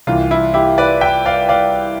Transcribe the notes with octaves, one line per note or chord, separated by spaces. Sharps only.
C2 C3 E3 F4
E4
E4 G4
B4 D5
E5 G5
D5 F5
D5 F5